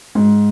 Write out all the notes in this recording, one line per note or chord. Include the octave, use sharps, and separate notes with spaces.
G#2